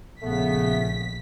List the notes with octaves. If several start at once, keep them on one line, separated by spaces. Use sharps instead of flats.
A#1 C#3 A3 B3 B6